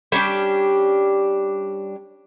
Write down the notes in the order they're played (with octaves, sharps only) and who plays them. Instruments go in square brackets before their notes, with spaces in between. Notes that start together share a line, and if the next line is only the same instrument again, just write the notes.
[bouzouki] G3 C#4 D4 G4